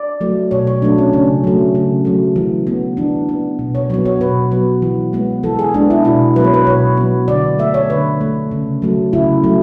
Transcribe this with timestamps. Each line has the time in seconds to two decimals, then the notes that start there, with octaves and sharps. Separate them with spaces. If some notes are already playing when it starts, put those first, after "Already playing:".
Already playing: D5
0.21 F#3 A3
0.51 B2 C#5
0.67 C#5
0.82 F#3 A3 D4
0.98 C#4
1.13 C#3 C#4
1.44 F#3 A3
1.75 C#3
2.05 F#3 A3
2.36 E3
2.67 B3
2.97 E3 D4
3.29 B3
3.59 B2
3.75 C#5
3.90 F#3 B3 C#5
4.05 C#5
4.21 B2 B4
4.51 F#3 B3
4.82 E3
5.13 G#3 B3
5.43 E3 A4
5.59 G#4
5.74 G#3 B3 D4
5.90 E4
6.05 B2 E4
6.36 F#3 B4
6.40 B3 C#5
6.54 B4
6.67 B2 C#5
6.97 F#3 B3
7.28 D3 D5
7.58 A3 E5
7.74 C#5
7.89 D3 B4
8.21 A3
8.51 C#3
8.82 F#3 A3
9.13 C#3 E4
9.44 F#3 A3